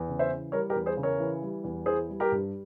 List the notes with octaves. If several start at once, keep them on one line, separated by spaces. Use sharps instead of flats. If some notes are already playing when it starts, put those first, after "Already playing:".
Already playing: E2
C#3
C5 E5
E3
G3 A#4 C#5
G4 A#4
E2
G#4 C5
C#3
A#4 C#5
E3
G3
E2
E3 G#4 C5
G3
G4 A#4
G2